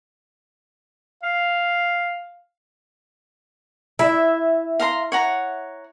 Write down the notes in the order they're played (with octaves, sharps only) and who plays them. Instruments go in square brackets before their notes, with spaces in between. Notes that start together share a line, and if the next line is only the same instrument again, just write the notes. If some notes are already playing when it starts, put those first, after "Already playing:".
[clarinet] F5
[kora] E4 [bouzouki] E5
[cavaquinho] F5 A#5 C6
C#5 F#5 A#5